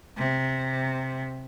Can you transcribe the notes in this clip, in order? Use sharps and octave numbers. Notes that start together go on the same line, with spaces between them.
C3